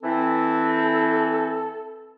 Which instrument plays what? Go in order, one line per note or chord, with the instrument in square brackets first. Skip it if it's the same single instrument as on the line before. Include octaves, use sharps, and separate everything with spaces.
[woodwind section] E3 C4 [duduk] A4